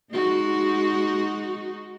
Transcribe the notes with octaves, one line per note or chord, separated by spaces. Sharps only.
G#3 D#4 F#4